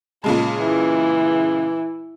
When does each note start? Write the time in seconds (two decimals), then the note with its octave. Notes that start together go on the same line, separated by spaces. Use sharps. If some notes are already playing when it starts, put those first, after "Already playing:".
0.24 A#2 C#3 G#3 A5
0.58 E3